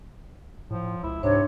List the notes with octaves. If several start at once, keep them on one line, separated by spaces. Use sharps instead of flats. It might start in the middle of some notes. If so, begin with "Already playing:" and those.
A2 F3
C#2 E4
G#2 C3 D4 C5 C#5